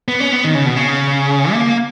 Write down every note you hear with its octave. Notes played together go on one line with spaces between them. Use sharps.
B3
C#4
B3
D#3
C#3
B2
C#3
A#3